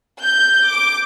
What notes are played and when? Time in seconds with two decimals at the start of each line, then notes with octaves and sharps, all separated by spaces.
0.22 G6
0.71 D6